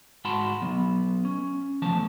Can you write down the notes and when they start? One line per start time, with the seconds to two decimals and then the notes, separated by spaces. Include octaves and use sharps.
0.25 G#2 F#4 A5 B5 C6
0.62 F#3 B3
1.25 C#4
1.82 E2 F3 A3 A5